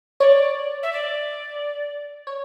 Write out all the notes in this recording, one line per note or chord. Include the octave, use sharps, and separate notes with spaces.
C#5 D5
E5
D5
C#5